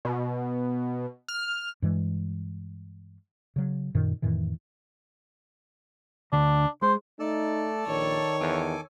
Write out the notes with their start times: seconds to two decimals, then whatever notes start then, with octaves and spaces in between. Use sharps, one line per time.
0.05 B2
1.28 F6
1.82 G2 E3 G#3
3.56 C#3 F#3
3.95 F#2 A#2 D#3
4.22 F2 A2 D#3 E3
6.33 D2 D3 D4
6.82 G#3 C5
7.20 A3 D#4 A4 D5 A5
7.88 A#1 D#3 C#5
8.40 E2 A4 G#5 D6